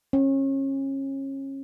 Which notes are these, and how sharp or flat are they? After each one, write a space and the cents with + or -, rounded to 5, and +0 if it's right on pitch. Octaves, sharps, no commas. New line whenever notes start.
C#4 -30